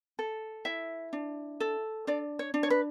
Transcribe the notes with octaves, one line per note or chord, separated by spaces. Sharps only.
A4
E4 E5
D4
A4
D4 D5
C#5
D4
C#5
B4